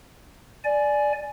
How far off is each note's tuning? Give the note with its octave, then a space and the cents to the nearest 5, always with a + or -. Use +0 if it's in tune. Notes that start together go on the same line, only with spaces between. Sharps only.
D5 +0 G#5 +15